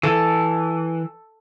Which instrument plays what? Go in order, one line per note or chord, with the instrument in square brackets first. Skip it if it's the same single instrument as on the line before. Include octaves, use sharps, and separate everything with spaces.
[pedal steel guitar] E3 [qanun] A4